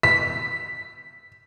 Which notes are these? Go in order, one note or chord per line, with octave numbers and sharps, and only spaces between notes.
B6